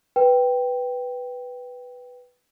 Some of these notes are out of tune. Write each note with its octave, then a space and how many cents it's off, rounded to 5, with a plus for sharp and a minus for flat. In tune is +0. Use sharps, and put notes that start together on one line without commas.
B4 +0 G5 +0